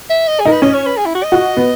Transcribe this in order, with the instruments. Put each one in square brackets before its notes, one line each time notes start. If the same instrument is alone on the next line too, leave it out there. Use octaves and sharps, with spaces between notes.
[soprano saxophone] E5
D#5
G#4
[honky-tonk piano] D#4 [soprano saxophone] A#4
[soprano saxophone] B4
[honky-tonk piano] C#4 [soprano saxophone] D#5
[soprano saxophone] C#5
B4
G#4
E4
F#4
D#5
[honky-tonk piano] F#4
B3